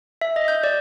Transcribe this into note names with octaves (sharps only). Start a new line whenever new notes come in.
E5
D#5
G6
D5